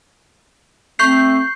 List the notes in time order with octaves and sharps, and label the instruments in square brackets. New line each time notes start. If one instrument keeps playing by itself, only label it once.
[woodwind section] A3 C4 [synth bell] C#6 G6 C7